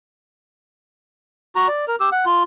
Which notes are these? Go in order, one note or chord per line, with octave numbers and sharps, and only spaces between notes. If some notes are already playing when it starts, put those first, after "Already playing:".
F#4 A#5
D5
A#4
G4 E6
F#5
F4